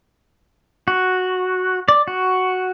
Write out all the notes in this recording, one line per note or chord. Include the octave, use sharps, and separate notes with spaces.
F#4
D5
F#4